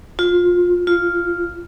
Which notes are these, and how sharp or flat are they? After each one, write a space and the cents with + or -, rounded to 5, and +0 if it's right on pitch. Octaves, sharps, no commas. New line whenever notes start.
F4 +20
F4 -5